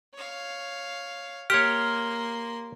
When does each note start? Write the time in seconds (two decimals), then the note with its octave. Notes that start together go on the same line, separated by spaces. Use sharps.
0.14 C#5 F5
1.50 A#3 G4 C#5 C6 F6